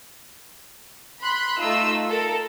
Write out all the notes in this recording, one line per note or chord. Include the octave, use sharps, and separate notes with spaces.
B5 C6 F#6
A3 D#4 F4 E6
A4 A#4